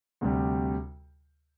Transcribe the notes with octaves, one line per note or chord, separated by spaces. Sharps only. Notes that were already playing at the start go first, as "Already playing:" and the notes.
D2 C3 G3